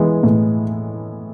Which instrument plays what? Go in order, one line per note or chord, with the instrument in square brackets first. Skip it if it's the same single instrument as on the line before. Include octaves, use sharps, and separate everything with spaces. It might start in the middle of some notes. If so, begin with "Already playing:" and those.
Already playing: [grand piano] E3 G#3 B3
A2